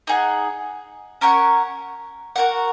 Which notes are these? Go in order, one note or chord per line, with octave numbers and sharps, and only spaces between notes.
D#4 G#4 F#5
C#4 A#4 C#5 F#5
F#4 A#4 F#5